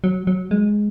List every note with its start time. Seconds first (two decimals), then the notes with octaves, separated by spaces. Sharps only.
0.04 F#3
0.27 F#3
0.51 G#3